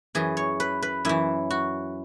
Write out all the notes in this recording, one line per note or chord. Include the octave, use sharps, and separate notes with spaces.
F#2 E3 G#4
C#5
B4
B4
F#2 E3 E4
F#4